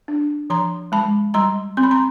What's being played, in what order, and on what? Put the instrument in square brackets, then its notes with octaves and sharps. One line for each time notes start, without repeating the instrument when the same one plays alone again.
[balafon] D4
F3 A#5 C6
G#3 A5 B5
G3 A#5 C6
C4 C6
B5
A#5 C6